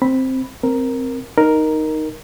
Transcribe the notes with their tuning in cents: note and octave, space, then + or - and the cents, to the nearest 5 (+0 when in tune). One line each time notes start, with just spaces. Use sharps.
C4 +0 B5 +0
C4 +0 A#4 +0
D#4 +0 A#4 +0